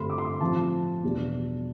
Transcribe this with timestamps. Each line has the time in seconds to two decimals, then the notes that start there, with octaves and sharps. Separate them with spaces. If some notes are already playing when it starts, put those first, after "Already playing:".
Already playing: G2 D3 A3 C4 B5 C6
0.10 D6
0.18 C6
0.25 D6
0.41 A2 F3 C4 A5
1.03 E2 B2 G3 D4